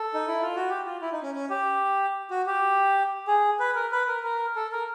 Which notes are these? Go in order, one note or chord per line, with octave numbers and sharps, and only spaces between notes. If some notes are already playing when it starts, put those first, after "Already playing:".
Already playing: A4
D#4
E4
F4
F#4
G4
F4
E4
D#4
C#4
C#4
G4
F#4
G4
G#4
B4
A#4
B4
A#4
A#4
A4
A#4